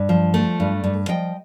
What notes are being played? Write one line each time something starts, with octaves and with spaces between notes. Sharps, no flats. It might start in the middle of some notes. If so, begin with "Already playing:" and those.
Already playing: G2
F3
A3
G2
G2
F3 D#5 G5